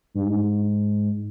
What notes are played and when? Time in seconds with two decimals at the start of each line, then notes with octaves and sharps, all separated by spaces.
0.15 G2
0.25 G#2